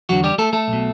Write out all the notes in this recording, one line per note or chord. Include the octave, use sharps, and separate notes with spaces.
E2 D3 F#3 F#4
G3 G4
A3 A4
A3 A4
B1
B2